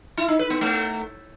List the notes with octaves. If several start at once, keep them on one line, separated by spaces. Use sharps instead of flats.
E4
D#4
B4
B3
A3